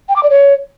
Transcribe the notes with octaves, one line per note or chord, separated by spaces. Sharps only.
G5
D6
D5
C#5